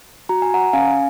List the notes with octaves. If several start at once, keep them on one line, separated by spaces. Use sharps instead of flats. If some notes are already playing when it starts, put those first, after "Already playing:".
F#4 A#5
G#5
F#5 A#5
C#4 F5 G#5